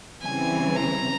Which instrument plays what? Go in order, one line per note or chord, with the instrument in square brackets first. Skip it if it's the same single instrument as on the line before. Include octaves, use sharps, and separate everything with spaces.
[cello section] C#3 E3 G3 C4 [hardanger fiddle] G#5
[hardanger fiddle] A#5